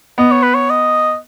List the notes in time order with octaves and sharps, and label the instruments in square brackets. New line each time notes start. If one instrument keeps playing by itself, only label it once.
[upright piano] B3 [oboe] D#5
[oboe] C#5
B4
C#5
D#5